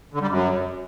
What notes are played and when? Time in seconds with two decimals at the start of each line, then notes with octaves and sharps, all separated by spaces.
0.14 D3
0.21 G3
0.29 F#2